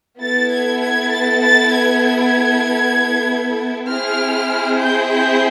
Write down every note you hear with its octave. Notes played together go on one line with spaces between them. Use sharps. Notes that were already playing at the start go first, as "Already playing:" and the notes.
B3 E4 A4 A6
G#6
G#6
A6
A6
G#6
G#6
C4 E4 G#4 F6
G6
G6